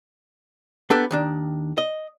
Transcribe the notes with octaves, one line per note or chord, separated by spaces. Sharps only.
A#3 B3 D4 G4 A4
D#2 D#3 D4
D#5